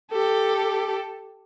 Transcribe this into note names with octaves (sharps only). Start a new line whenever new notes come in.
G4 A4